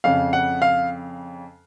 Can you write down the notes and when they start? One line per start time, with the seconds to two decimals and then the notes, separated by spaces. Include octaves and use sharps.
0.04 F2 C#3 F5
0.33 F#5
0.62 F5